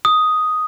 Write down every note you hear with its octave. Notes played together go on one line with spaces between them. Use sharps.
D#6